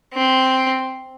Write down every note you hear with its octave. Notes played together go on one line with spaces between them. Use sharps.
C4